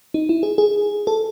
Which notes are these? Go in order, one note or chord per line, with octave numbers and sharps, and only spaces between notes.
D#4
E4
G#4
G#4
A4